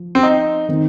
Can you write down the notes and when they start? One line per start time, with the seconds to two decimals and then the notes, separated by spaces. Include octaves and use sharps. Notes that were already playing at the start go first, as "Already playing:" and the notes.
Already playing: F3
0.15 C4
0.23 D#4
0.68 D#3 C4 D#4